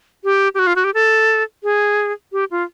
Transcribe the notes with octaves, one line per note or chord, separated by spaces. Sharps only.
G4
G4
F#4
F4
F#4
G4
A4
G#4
G4
F4